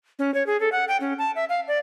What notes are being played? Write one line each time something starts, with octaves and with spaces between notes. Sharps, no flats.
C#4
C#5
G#4
A4
F#5
G5
C#4
A5
E5
F5
D5